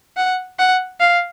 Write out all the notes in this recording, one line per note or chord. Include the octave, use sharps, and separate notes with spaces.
F#5
F#5
F5